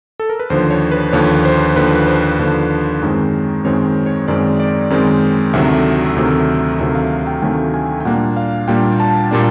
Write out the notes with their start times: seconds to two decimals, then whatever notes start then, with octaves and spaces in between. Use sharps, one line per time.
0.19 A4
0.29 A#4
0.40 B4
0.50 D#2 D3 F3 C5
0.70 C#5
0.92 B4
1.13 D#2 D3 F3 C#5
1.45 C5
1.76 D#2 D3 F3 B4
2.07 C5
2.39 D#2 D3 F3
3.02 F#2 D#3 G#3 C4
3.65 F#2 D#3 G#3 C4 C#5
4.06 C#5
4.28 F#2 D#3 G#3 C4 D5
4.60 D5
4.90 F#2 D#3 G#3 C4
5.53 D2 C3 D#3 F#3 A3 E5
6.16 D2 C3 D#3 F#3 A3
6.79 D2 C3 D#3 F#3 A3 E5
6.95 F5
7.27 G5
7.42 D2 C3 D#3 F#3 A3 G#5
7.74 G#5
8.00 G5
8.05 A#2 G3 A#3 D4 F#5
8.37 F5
8.68 A#2 G3 A#3 D4 G5
9.00 A5
9.31 A#2 G3 A#3 D4